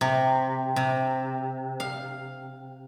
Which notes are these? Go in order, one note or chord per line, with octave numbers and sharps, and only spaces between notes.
C3
C3
F5